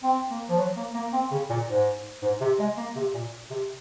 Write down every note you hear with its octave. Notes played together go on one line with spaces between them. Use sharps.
C4
A#3
F3
F#3
A#3
A#3
C4
C#3
A#2
G#2
G#2
C3
G#3
A#3
C3
A#2
C3